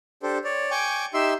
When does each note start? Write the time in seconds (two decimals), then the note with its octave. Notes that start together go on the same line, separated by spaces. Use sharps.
0.23 D4 G4 A4 C5
0.44 C#5 D5
0.71 G5 G#5 C#6 D6
1.14 D#4 G4 E5 C6 E6